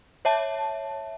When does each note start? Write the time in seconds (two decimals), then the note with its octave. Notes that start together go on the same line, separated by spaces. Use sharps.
0.25 C#5 E5 A5